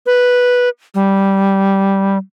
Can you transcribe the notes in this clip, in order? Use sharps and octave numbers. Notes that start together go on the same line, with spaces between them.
B4
G3